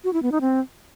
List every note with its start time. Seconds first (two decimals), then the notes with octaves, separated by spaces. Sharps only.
0.04 F#4
0.13 E4
0.23 B3
0.32 D#4
0.41 C4